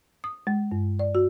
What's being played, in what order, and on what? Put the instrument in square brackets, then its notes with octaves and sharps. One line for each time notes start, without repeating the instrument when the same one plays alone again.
[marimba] D#6
G#3
G2
D5
F#4